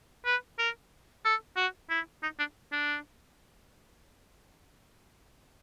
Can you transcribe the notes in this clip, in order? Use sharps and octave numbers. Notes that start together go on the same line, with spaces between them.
B4
A#4
A4
F#4
E4
D#4
D4
D4